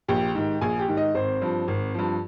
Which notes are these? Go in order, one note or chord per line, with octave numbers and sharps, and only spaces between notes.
A#1 G4 G5
G#2 D#3
A#1 G#4 G#5
G4 G5
G#2 D#3
D#4 D#5
G#1 C4 C5
G2 F3
G#1
G2 F3